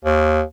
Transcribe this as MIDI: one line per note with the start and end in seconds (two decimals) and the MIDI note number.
0.04 0.41 39